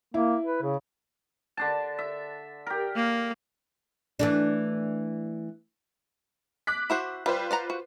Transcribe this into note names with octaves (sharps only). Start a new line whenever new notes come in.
A#3 E4
B4
C#3
D3 D4 A5
E5
G4 A#4
A#3
E3 A3 D4
D6 F#6 B6
E4 F#4 C5
G3 F4 B4 C5
D5 F#5 A#5
F#4